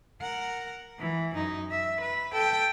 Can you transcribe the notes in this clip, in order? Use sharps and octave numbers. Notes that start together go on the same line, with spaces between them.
A#4 F#5
E3
F#2 D#4
E5
B4
A4 G5